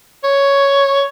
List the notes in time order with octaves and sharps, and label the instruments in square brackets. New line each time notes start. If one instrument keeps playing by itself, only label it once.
[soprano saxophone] C#5